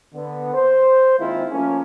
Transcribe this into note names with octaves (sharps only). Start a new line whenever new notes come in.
D3 B3
C5
D#3 G#3 A#3 C4 E4 F4
F3 A3 A#3 C#4